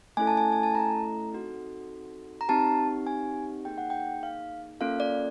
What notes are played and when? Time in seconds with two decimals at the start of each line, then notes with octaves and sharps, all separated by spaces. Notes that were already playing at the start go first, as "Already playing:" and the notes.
0.17 A3 C#4 E4 A4 G#5
0.27 A5
0.37 G#5
0.52 G#5
0.63 A5
0.75 A#5
1.32 C4 D#4 F#4 A4
2.41 A#5
2.49 C4 D#4 G4 A5
3.07 G#5
3.65 A#3 D#4 G#4 G5
3.78 F#5
3.90 G5
4.23 F5
4.80 A#3 C#4 F4 A4 F5
5.00 D5